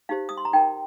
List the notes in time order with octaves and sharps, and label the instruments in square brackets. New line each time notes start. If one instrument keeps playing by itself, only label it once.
[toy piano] D#4 G4 C5 F5
D#6
C6
A#5
D#4 A#4 G5